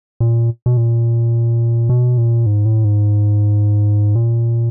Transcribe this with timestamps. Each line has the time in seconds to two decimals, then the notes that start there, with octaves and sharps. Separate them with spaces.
0.20 A#2
0.66 B2
0.77 A#2
1.89 B2
2.18 A#2
2.46 G#2
2.65 A2
2.85 G#2
4.15 A#2